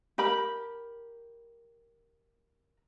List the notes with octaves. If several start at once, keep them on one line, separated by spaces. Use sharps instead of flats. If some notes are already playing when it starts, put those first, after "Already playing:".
G4 A#4 B5